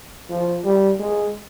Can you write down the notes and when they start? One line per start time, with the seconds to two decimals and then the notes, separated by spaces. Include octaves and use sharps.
0.30 F3
0.65 G3
1.00 G#3